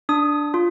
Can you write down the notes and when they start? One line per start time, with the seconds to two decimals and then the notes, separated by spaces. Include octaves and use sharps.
0.09 D4 D#6
0.54 F4